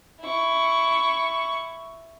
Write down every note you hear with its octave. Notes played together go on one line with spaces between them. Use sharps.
E4 C#6